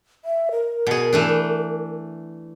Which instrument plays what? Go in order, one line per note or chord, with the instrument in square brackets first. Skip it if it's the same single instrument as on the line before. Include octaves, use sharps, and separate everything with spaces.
[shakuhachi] E5
A#4
[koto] B2 G#4
E3 A3 D4